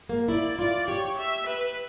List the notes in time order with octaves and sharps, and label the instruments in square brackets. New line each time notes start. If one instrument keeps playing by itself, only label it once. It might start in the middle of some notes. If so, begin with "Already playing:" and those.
[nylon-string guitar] A#3
[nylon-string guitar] E4 [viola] D5
[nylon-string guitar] F4 [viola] D5
[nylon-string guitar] G4 [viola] C#5
[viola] E5
B4